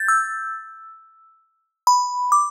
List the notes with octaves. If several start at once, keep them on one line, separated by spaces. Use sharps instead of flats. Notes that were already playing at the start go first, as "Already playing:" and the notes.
Already playing: G6 A6
E6
B5
D6